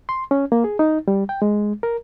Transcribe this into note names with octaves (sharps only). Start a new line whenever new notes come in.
C6
C#4
A#3
G#4
D#4
G3
G5
G#3
A#4